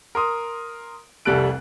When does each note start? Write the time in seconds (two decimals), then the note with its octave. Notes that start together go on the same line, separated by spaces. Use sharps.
0.15 A#4 C6 D#6
1.25 F1 C2 G3 A4 F#6 D7